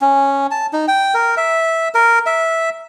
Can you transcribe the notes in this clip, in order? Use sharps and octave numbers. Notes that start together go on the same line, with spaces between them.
C#4
A5
D#4
G5
A#4
E5
A#4
E5